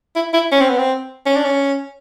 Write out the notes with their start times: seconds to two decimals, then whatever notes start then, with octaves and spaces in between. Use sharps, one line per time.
0.16 E4
0.34 E4
0.52 C#4
0.61 C4
0.69 B3
0.78 C4
1.26 C#4
1.36 D4
1.45 C#4